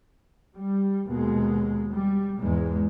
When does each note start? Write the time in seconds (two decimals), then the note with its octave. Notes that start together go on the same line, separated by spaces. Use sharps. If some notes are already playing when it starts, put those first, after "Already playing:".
0.55 G3
1.06 D#2 B2 G#3
1.92 G3
2.39 E2 G#2 G#3